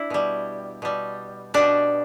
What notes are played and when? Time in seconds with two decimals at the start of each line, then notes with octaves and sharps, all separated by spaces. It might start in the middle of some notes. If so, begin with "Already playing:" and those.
Already playing: D4 E4
0.10 B2 G3
0.82 B2 G3
1.54 B2 G3 D4